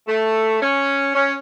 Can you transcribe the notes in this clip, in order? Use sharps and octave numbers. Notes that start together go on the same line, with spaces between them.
A3
C#4
C#4